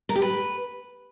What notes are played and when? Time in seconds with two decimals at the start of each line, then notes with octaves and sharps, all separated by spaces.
0.09 A#4
0.16 G4
0.22 B4